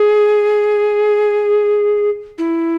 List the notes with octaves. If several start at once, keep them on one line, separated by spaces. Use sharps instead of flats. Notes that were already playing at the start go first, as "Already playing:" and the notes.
Already playing: G#4
E4